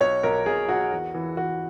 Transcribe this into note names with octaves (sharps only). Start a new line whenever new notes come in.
B1 C#5
B1 A#4
B1 G#4
B1 F#4
E2
E3
E3 F#4